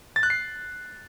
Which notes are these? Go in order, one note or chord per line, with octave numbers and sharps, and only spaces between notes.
A6
F#6
C7